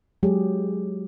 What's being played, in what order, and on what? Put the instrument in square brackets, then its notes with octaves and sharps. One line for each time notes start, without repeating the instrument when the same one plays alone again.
[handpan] F#3 G#3 G4 G#4